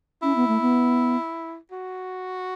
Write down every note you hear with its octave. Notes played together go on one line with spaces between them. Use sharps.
C#4 E4
B3
A3
B3
F#4